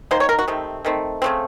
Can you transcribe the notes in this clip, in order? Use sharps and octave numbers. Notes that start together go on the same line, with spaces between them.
D#3 A#3 C5
C#5
A#4
F#4
C3 D#3 A3 C4
D#3 A3 C4
C#3 A3 C4